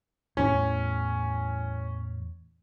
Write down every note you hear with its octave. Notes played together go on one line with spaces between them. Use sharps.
E2 A2 C#4